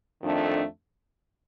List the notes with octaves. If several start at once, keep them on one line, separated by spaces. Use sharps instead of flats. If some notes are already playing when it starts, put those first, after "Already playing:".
F2 D#3 A3 D4